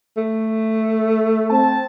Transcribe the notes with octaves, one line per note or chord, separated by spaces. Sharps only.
A3
C4 A5